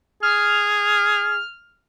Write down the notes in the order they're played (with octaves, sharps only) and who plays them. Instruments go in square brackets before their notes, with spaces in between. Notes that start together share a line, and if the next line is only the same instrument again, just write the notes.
[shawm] G#4 [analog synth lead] F6